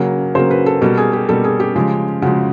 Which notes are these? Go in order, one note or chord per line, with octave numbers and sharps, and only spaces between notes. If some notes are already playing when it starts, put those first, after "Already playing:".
Already playing: C#3 F#3 A#3
C#3 F#3 A#3 C5
B4
A4
B2 G3 A#3 A4
G#4
G4
B2 G3 A#3 A4
G#4
G4
C#3 F3 G#3
C#3 F3 G#3 F#4